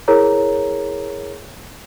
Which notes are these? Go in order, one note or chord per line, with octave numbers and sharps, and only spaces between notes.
E4 G#4 A#4 C#5 A#5